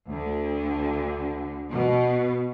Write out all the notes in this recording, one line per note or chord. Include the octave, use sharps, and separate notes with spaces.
D2 D3
B2